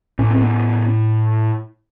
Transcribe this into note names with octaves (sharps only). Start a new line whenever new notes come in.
A2 C#4
C4
B3 C#4